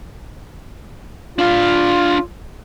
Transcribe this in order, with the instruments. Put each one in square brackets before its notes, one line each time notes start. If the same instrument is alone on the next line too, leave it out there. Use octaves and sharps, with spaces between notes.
[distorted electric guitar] D4 F5 [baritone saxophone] F4